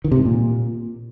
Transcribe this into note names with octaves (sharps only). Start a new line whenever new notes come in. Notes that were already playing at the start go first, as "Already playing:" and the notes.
D#3
C3
G#2
A#2